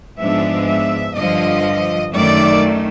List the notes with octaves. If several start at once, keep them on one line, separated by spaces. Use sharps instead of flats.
G#2 F3 G#3 B3 D4 E5
E5
G2 D3 F3 D#5
F#2 D#3 F#3 A3 D5